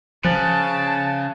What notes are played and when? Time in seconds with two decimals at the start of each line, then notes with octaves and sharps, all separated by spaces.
0.24 C#3 F3 A5 F#6 A6